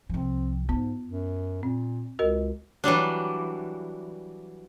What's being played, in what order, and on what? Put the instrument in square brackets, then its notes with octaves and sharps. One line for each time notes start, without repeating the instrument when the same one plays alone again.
[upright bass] C2 F3 [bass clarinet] C4
[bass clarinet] G#2 [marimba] B3 [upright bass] F4
[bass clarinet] F#2
[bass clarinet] A#2 [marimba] C4
[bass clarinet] C#2 [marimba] F#4 A#4 D#5
[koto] E3 F#3 G3 D4